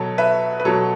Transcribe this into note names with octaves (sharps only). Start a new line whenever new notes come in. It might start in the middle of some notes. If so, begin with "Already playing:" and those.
Already playing: B2 F#3 A4 C#5
B4 E5
B4
B2 F#3 A4 C#5